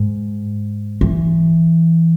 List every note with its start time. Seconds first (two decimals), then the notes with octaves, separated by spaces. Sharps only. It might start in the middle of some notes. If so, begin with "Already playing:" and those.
Already playing: G#2
1.01 E3